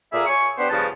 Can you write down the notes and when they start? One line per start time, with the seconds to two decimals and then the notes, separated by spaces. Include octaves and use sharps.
0.13 A#2 A3 A#3 G#4 E5
0.26 C#5 G#5 C#6
0.58 B3 D4 G4 B4 C5
0.70 C#2 G2 C#3 F3 B3 A5